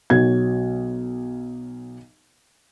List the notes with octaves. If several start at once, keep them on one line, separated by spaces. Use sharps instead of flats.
B1 F#3 G#6